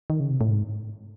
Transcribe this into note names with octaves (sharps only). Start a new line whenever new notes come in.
D#3
C#3
C3
A2
G#2